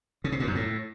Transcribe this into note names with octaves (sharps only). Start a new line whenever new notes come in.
C#3
C3
A#2
F#2
A2